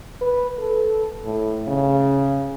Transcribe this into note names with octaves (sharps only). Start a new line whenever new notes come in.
B4
A4
A2
C#3